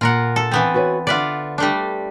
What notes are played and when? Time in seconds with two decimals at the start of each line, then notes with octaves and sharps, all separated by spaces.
0.01 A#2 F4 A#4 F#5
0.36 A4
0.51 E3 B3 C4
0.74 F#4 B4 C#5
1.07 D3 F4 B4 D5 E5 F#5
1.58 G3 A3 D4